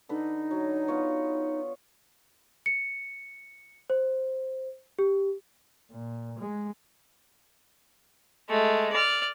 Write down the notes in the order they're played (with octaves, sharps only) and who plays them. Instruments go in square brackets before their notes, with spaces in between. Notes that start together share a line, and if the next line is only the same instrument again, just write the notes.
[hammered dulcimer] D3 B4 [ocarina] D#4
[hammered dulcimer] F#3
B3 F4 C#5
[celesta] C#7
C5
G4
[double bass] A#2
G#3
[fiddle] G#3 A3
D5 F6